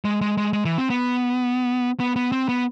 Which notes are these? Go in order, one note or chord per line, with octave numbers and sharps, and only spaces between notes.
G#3
G#3
G#3
G#3
E3
C4
B3
B3
B3
C4
B3